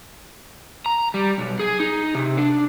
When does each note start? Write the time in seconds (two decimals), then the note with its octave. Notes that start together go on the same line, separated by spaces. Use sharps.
0.86 A#5
1.14 G3
1.38 B1
1.59 G#4
1.80 D#4
2.15 C3
2.37 D4